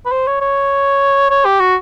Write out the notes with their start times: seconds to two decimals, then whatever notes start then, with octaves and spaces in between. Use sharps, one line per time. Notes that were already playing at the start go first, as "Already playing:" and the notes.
0.06 B4
0.12 C5
0.27 C#5
0.41 C#5
1.30 C#5
1.45 G4
1.60 F#4